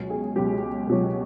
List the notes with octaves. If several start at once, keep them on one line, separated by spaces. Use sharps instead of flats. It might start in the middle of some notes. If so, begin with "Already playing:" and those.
Already playing: C#2 B2 F#3
G#4
C#2 B2 F#3 G4
C#2 B2 F#3